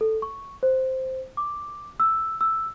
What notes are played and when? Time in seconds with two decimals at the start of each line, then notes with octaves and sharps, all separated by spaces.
0.01 A4
0.22 C#6
0.63 C5
1.37 D6
2.00 E6
2.41 E6